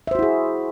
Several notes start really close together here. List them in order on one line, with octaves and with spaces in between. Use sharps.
E5 C5 F#4 E4 G#4